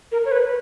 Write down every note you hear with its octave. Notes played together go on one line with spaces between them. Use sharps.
A#4
C#5
B4